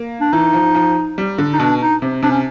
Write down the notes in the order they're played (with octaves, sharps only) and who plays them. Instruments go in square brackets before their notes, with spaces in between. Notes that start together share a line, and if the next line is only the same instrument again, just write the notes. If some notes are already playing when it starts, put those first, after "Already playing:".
Already playing: [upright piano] A#3
[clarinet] D4
[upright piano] E3 [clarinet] D#4
[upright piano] F3
F3
G3
D3
[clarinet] D#4
[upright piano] B2 [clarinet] D4
[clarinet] D#4
[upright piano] C3
[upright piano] C3 [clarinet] D4
[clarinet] C#4